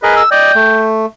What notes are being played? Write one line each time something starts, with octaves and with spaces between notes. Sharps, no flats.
G#4 A#4 B4 D#5
E6
D5 D#5 G5
A3